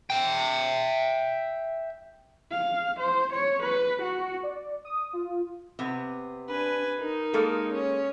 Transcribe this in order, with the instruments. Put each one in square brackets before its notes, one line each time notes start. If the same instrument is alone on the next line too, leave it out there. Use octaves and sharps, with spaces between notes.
[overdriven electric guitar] E5 G5
[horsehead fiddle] F5
C5
C#5
B4
F#4
[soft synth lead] D5
D#6
F4
[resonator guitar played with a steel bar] C3 B3
[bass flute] D4 [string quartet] B4 G#5
[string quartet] D#4 [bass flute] A#4
[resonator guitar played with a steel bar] G#3 A#3 A4
[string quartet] C#4